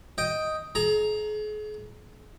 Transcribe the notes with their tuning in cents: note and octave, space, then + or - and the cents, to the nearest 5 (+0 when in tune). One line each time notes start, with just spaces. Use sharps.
D#5 +5 G5 +0
G#4 +40 A#5 +0